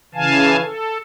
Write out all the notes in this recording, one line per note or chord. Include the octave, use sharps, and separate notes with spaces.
C#3 E3 F5 G#5 A5
A4